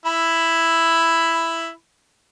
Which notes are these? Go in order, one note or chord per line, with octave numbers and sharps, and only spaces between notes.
E4 B5